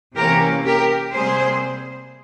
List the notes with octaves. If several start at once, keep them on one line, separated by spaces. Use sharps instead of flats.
C3 E3 A#3 C#4 G4 A#4
G4 A#4
C3 G3 A#3 G#4 C5